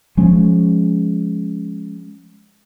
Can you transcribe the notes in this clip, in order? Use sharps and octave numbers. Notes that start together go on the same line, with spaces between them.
F3 G#3 C#4